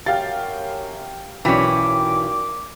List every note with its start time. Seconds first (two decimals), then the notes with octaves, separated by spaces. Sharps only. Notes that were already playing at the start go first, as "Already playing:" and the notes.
0.06 F#2 G4 F5 A6
1.45 B1 A#2 E3 C#4 G5 D6 B6